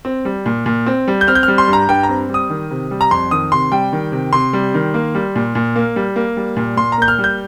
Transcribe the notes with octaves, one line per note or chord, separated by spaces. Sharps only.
C4
G3
A#2
A#2
C4
G3
G6
C4 F6
G6
G3 F6
C6
G2
A#5
G2 G5
A#5
C4
G3
D#6
D#3
C3
G3
A#5
F2 C6
D#3 D#6
C3 C6
G3 G5
D#3
C3
C3 C6
G3
D#3
A#3
G3
A#2
A#2
A#3
G3
A#3
G3
A#2
A#2 C6
A#5
A#3 G6
F6
G3
G6